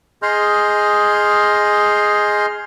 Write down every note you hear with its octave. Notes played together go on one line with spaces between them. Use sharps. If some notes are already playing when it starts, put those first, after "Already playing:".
G#4 D#5 C6 F6 G6